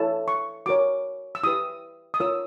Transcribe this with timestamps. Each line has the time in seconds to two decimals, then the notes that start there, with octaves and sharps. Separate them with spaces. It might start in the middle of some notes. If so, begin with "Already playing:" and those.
Already playing: E4 A4 C#5 A5
0.28 C#6
0.66 F#4 A#4 C#5 D6
1.35 E6
1.43 E4 G4 B4 D#6
2.14 D#6
2.20 F4 A#4 C#5 E6